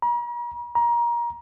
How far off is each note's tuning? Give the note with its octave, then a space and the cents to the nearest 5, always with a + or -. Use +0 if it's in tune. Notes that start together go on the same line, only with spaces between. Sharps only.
A#5 +45
A#5 +25